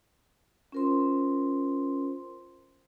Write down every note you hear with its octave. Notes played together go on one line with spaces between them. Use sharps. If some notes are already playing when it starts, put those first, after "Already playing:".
C#4 F4 A#4 C5 C6